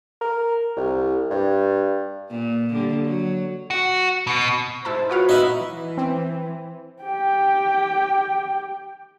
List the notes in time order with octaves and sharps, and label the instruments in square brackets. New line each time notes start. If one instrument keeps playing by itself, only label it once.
[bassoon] A#4
C2
G2
[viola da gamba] A#2
D3 G3 A#3
F#3
[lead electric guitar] F#4
B2
[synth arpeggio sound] G#2 E4 A5 [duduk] C5
[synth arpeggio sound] F4 C#5 F5 [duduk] F#4 [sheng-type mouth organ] B4
[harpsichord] D#4 E4 [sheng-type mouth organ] B4 D#5 B5
[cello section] E3
[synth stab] C4
[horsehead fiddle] G4 G5